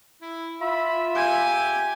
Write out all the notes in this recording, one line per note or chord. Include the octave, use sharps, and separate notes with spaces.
E4
F4 E5 B5
G4 G#5